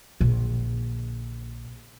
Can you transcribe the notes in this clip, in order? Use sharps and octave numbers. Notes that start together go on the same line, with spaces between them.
A#1 D3